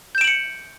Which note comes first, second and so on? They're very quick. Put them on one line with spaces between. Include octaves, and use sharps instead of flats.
G6 E7 D7 F#7 C#7